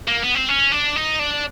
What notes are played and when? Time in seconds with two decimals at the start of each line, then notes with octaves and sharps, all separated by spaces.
0.08 A#3
0.22 B3
0.35 C4
0.49 C#4
0.72 D4
0.96 D#4
1.19 D4